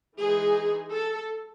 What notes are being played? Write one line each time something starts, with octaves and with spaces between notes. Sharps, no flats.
E3 G#3 D#4 G#4
A4